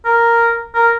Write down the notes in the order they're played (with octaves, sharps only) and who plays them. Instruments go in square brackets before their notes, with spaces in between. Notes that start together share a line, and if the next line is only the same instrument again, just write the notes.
[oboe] A#4
A#4